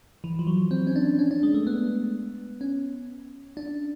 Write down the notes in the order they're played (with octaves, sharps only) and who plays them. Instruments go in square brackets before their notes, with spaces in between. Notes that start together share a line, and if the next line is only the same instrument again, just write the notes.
[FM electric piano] E3
F3
F#3
C4
C#4
D4
C#4
D4
G#3
A3
B3
C#4
D4